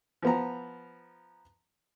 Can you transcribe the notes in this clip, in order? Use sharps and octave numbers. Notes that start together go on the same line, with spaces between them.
F3 B3 A#5